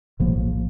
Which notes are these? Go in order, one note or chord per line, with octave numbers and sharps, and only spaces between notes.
A#1 A2 F3 A#3